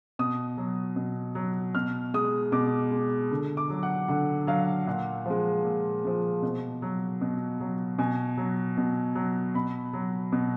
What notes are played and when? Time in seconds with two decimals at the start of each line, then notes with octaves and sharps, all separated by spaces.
0.19 B2 D#6
0.58 F#3
0.96 B2
1.35 F#3
1.75 B2 F6
2.14 G#3 D#6
2.52 B2 D6
2.91 G#3
3.31 D3
3.57 D6
3.70 F#3
3.83 F#5
4.08 D3 F#5
4.47 F#3 F5
4.86 A#2 F#5
5.26 F3 G#3
5.64 A#2
6.04 F3 G#3
6.42 B2
6.82 F#3
7.21 B2
7.60 F#3
7.99 B2 G#5
8.37 F#3
8.77 B2
9.15 F#3
9.55 B2 B5
9.93 F#3
10.32 B2